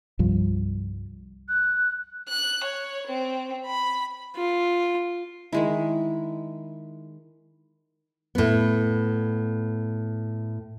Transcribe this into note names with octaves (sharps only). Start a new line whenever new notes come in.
C2 G2 F3
F#6
F#6
C#5
C4
B5
F4
D#3 G#3 E4
A2 B3